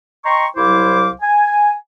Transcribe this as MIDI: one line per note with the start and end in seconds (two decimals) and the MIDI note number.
0.25 0.46 75
0.25 0.46 79
0.25 0.46 82
0.25 0.46 84
0.25 0.46 85
0.57 1.11 36
0.57 1.11 54
0.57 1.11 64
0.57 1.11 72
0.57 1.11 77
0.57 1.11 86
1.22 1.73 80